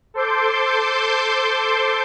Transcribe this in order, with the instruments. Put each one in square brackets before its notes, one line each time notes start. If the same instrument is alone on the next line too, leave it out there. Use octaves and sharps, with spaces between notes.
[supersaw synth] A4 C5 C6 D6 G6